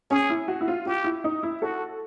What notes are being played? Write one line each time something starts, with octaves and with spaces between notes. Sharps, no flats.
C#4 G#4
E4
F#4
E4
F4
F4 G4
E4
D#4
E4
F#4 A4